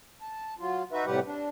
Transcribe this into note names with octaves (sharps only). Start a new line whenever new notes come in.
A5
F#3 F4
D#4 F#4 B4 E5
A2 C3 G3 G4 B4 F#5
D4